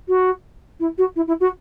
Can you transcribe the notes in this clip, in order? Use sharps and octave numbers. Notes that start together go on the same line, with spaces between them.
F#4
E4
F#4
E4
E4
F#4